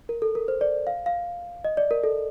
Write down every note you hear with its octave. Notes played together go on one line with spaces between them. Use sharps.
A#4
A4
A#4
C5
D5
F5
F5
D#5
D5
A#4
A4